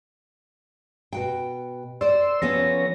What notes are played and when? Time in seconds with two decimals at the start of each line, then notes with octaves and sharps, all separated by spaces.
1.13 B2 F#4 G5
2.01 C5 D5 C6 E6
2.42 F3 B3 C#4 A4 C#5 A#6